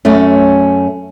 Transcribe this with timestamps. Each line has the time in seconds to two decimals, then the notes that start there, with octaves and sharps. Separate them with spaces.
0.05 F#2 A3 C#4